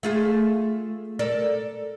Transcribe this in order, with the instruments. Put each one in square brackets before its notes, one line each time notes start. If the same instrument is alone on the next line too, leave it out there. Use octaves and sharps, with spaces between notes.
[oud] A3 F4 G#4
A4 A#4 D5